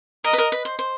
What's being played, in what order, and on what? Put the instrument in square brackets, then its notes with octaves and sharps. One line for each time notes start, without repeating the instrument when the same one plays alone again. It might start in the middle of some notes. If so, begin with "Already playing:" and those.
[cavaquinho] A#4 [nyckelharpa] D#5
[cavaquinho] B4
A#4
B4
C5
C5